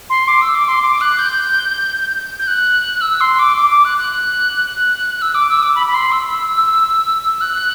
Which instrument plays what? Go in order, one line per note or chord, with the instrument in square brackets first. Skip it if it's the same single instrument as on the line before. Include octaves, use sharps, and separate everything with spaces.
[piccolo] C6
D6
E6
D6
C6
D6
F#6
G6
G6
F#6
E6
C6
D6
D6
D6
F#6
F#6
F#6
F#6
E6
D6
E6
D6
B5
B5
C6
E6
F#6